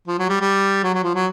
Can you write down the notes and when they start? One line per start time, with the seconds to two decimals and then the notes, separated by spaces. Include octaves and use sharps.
0.08 F3
0.19 F#3
0.29 G3
0.41 G3
0.84 F#3
0.94 F#3
1.04 F3
1.15 F#3